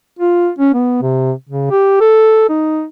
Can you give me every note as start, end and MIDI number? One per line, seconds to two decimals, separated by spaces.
0.19 0.49 65
0.59 0.73 61
0.74 0.99 59
1.02 1.32 48
1.49 1.71 49
1.71 1.97 67
2.01 2.48 69
2.49 2.85 63